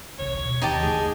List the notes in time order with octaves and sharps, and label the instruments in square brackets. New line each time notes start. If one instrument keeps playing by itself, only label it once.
[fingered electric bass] D#1 B1 C3 [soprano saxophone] C#5
[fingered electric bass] B2
[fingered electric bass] D#2 E3 [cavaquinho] D#4 G4 A5
[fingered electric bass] F#1 D3 A3 [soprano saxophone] G#4